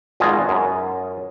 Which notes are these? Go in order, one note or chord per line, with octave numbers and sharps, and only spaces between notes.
G#1 B2 F4 G#4 A#5
F#2